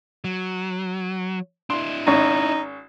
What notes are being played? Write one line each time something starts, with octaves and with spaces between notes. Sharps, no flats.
F#3
D4 E4 C6
G#1 C#4 D#4